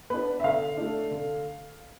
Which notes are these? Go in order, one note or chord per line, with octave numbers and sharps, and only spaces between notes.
B3 D4 B4
E5
D3 F5
A3 D4
D3